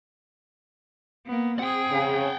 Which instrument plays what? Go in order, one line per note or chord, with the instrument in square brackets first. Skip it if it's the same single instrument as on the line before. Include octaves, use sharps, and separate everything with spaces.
[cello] A#3 B3
[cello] C4 G#4 [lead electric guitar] F#5 G5
[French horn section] C#3